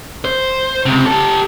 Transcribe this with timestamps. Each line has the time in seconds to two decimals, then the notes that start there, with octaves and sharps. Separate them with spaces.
0.25 C5
0.86 C#2 C3
1.06 G4 A4